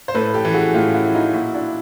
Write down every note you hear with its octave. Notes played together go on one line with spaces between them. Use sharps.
C5
A2 A4 B4
G4 A4
E3
F#4 G#4
A2 F4 G4
E4 F#4
E3
D#4 F4
A#2 E4 F#4
D4 E4